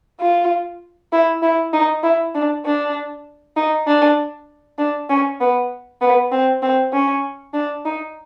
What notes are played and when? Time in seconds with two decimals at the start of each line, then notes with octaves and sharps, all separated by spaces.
0.20 F4
1.12 E4
1.42 E4
1.73 D#4
2.03 E4
2.35 D4
2.66 D4
3.57 D#4
3.87 D4
4.79 D4
5.10 C#4
5.41 B3
6.01 B3
6.32 C4
6.62 C4
6.93 C#4
7.54 D4
7.85 D#4